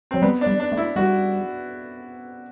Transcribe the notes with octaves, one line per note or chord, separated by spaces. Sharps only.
F#3 C4
G3 B3
D4
G3
D4
A3
E4
G3 F#4